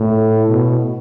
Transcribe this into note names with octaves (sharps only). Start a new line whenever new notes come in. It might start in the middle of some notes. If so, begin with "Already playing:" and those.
Already playing: A2
B2